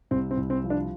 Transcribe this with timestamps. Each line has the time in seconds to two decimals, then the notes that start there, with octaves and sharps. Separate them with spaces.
0.11 C2 C4
0.31 C4
0.37 C2
0.50 C4
0.64 F3
0.70 D4